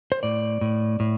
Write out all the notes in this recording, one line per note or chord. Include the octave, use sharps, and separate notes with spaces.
C5
A2 D5
A2
A2